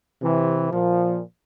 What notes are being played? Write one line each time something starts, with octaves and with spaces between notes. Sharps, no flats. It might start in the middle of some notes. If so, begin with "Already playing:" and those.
C3 E3
A#2 F3